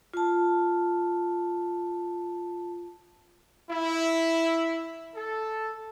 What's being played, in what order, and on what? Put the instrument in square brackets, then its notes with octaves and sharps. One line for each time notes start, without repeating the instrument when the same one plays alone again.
[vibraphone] F4 A5
[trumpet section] E4
A4